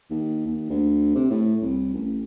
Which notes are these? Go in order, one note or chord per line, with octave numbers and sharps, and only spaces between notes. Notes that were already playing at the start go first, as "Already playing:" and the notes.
D#2
D#2
D2
C3
A2
C2
A1